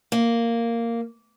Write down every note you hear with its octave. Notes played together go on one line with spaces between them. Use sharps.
A#3